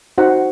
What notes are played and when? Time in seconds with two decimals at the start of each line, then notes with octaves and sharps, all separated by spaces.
0.18 D#4 F#4 C5 F#5